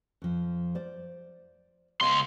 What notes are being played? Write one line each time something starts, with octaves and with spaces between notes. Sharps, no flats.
F2 F3
C5 D5
C#2 B3 D#5 F5 C6